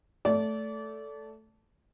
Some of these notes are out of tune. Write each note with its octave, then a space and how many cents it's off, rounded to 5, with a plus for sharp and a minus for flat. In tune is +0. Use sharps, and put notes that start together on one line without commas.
A3 +0 D5 -30